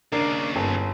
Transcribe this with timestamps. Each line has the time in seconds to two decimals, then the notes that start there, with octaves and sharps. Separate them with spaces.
0.12 D#2 C#3 D4 A#4
0.56 G1